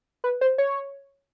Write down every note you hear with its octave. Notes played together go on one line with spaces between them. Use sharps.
B4
C5
C#5